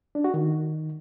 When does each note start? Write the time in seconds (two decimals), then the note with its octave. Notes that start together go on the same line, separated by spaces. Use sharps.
0.15 D4
0.24 F#4
0.34 D#3